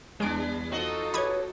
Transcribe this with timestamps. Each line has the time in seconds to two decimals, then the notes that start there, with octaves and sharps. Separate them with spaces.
0.20 E2 G3 G#3 D4 D7
0.71 C4 D#4 F4 F#4 A4 D#5
1.14 G4 B4 C#5 B5 D#6 G#6